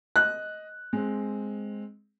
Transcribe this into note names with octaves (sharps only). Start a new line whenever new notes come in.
D#5 F#6
G#3 C4